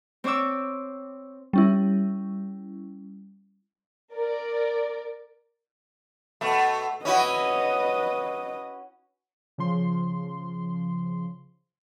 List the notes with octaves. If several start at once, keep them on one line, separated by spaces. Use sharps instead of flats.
C4 C5 C#5 D6 E6
G3 C#4 E4
A#4 D5
B2 A3
C#4 E4 F#4 B4 D#5
C#3 F3 C6